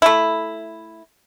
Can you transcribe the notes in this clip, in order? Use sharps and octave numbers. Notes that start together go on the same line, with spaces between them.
A3 E4